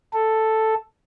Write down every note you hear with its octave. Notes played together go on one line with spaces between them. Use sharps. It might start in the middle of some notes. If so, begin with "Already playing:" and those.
A4